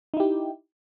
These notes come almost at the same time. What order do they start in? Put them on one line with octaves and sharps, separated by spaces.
D#4 E4 G4